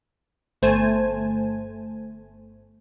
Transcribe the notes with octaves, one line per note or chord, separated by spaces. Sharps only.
G1 A3 C5 G#5 A5 G#6